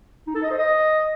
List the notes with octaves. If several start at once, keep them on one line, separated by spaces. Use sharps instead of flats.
D#4
A4
D#5
C5
D#5